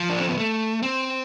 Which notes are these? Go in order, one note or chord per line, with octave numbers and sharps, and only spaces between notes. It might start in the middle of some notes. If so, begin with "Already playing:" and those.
Already playing: F3
D4
C4
B3
A3
C4